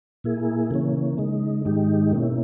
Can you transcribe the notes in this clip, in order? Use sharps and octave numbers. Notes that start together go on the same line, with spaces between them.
A#2 A#3 E4 G#4
C#3 E3 A#3 C#4
C#3 G#3 D#4
G#2 D#3 G#3 D#4 G4
B2 A#3 C#4 E4